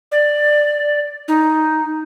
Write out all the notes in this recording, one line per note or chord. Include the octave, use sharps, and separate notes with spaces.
D5
D#4